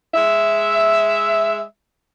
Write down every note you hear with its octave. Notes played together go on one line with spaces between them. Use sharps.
G#3 E5